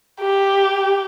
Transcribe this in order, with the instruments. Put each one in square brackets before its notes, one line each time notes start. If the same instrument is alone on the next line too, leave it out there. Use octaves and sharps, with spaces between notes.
[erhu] G4